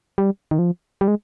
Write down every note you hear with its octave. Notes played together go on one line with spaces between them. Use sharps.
G3
D#3
F3
G3
G#3